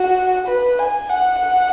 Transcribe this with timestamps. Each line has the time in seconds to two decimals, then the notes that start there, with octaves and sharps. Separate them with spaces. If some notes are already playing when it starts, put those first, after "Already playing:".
Already playing: F#4
0.47 B4
0.79 G#5
1.09 F#5
1.40 F#5